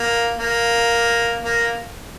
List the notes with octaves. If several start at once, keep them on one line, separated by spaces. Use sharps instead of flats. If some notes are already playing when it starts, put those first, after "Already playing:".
Already playing: A#3
A#3
A#3